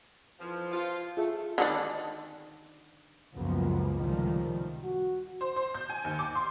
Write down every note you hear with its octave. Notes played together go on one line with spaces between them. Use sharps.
F2 E3 F3
F3 F4
A3 F4 G#4 E5
D3 D#3 D4
C#2 F#2 F3 A#3 B3
C#2 A2 C3 D#3 F3 G3
F#4
C5
C5
G6
G#5
D#2
D6
C6